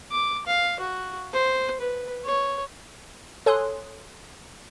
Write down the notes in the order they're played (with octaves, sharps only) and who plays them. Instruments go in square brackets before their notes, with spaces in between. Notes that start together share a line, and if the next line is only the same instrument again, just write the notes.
[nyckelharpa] D6
F5
F#4
C5
B4
C#5
[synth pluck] A4 C#5 G#5 C6 D#6 F#6